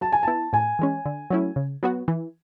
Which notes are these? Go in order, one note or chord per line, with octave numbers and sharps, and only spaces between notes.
F#3 A5
G#5
B3 E4 A5
A2 G#5
E3 G#3 C#4
D3
F#3 A3 C#4 E4
C#3
F#3 B3 F#4
E3